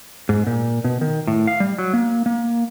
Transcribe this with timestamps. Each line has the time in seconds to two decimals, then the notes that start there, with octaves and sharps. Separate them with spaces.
0.29 G#2
0.47 A#2
0.84 B2
1.01 D#3
1.27 A2
1.47 F5
1.60 G3
1.79 F#3
1.94 A#3
2.26 A#3